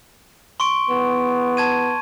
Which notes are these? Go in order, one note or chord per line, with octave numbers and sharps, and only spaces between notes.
C6 C#6 D7
E2 B3
A5 G#6 D#7